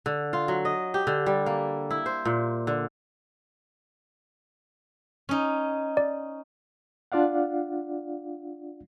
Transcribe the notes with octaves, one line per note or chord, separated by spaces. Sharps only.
D3
F4
F#3
D#5
G4
D3
G3
A#3
E4
C5
A#2
D3
C#4 D#4
D5
D4 F4 D5 F5 F#5